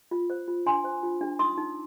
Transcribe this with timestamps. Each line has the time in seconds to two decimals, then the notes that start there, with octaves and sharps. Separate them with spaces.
0.11 F4
0.30 C5
0.48 F4
0.66 D4 G#5 C6
0.84 C5
1.03 F4
1.21 D4
1.39 D#4 C6 D#6
1.58 D#4